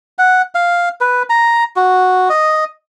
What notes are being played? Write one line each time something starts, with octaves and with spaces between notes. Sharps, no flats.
F#5
F5
B4
A#5
F#4
D#5